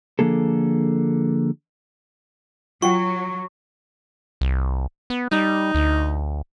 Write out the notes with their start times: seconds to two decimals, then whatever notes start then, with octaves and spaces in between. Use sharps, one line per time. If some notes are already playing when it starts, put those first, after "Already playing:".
0.19 D3 F3 A#3 G#4 A4
2.82 F#3 F4 F#5 G5 C#6
4.41 C2
5.10 B3
5.32 G3 D#4
5.75 D2